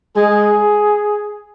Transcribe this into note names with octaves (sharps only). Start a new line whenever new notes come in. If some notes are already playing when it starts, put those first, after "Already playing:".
G#3 G#4